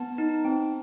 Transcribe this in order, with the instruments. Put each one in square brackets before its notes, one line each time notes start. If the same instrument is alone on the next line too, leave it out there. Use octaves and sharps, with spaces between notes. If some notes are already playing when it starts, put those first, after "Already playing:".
Already playing: [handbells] B3 A5
D#4
C4